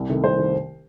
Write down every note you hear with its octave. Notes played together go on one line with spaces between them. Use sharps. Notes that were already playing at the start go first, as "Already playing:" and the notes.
Already playing: C2
C3 D#3 A3
C2 C5
D#3 A3